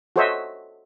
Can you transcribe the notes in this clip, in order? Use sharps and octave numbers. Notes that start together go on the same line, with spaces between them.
F#4 A4 C5 C#5 D#5 E5